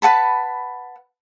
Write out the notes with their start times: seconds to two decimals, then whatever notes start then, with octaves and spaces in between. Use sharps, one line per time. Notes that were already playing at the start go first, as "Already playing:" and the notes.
0.02 B4 F#5 A5 B5